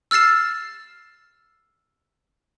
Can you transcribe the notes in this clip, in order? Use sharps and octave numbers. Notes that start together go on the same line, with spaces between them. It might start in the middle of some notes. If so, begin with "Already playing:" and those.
E6 F6 A6 C7 E7